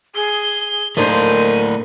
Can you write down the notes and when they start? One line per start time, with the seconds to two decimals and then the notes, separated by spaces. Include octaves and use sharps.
0.15 G#4 G7
0.97 A2 A#3 D4 D#4 A4 C5 D#7